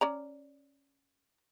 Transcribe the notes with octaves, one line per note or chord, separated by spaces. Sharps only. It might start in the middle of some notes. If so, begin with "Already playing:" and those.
C#4 D5 A#5